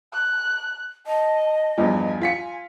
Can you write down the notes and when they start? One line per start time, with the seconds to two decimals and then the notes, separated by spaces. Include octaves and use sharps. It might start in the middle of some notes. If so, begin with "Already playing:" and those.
0.13 F#6
1.06 D#5 A5
1.78 E2 G2 F3 G#5
2.22 F4 G#5 B6 C#7